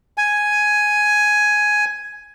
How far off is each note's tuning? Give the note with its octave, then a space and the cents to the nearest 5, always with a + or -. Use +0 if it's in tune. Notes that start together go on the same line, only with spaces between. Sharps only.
G#5 +5